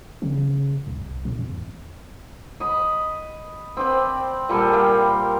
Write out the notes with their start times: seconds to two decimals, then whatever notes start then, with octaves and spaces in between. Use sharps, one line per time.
0.22 C#3
0.87 C2
1.25 A2
1.39 E2
2.60 D#5 B5
3.77 C4 B4 D5 G5
4.49 A#2 G3 A4 G#5
4.73 A#4 F5 G5